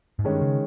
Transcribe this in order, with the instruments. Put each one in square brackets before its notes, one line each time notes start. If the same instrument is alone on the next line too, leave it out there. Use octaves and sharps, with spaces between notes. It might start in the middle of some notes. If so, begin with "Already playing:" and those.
[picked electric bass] G#2
[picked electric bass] G2 [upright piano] D#3 G#3 C#4
[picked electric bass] C#3